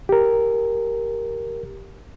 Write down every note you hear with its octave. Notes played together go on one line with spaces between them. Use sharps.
G4 A#4